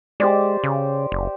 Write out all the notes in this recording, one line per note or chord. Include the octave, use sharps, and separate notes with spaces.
G#3 G4 C5 D5
C#3
F#1